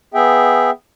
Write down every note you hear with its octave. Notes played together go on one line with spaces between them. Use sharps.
B3 G#4 E5 G5